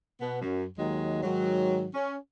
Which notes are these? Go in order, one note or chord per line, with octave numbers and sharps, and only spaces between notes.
B2 B3
F#2
D#2 D#3 F#3 G#3
G#2 D#3 F#3
C#4